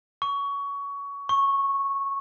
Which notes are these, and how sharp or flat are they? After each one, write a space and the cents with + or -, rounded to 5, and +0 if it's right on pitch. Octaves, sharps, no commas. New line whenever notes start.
C#6 +20
C#6 -10